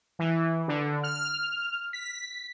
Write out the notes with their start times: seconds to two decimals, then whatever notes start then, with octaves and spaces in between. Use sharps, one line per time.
0.19 E3
0.68 D3
1.03 F6
1.93 B6